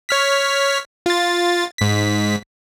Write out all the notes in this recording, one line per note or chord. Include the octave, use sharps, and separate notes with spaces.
C#5 F6 B6
F4 A6
G#2 B6